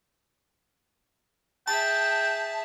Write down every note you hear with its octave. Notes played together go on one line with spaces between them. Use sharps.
G#4 E5 G5 A5